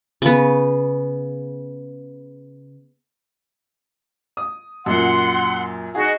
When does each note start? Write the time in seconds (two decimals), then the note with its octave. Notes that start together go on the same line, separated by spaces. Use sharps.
0.22 C#3 B3
4.37 D#6
4.86 F#2 A#2 F#5 C6
5.95 D#4 F#4 G#4 D#5